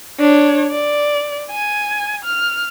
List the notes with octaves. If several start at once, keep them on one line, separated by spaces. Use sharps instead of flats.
D4 C#5
D5
G#5
F6